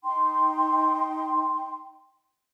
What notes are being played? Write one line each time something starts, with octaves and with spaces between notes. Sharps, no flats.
D#4 G5 C6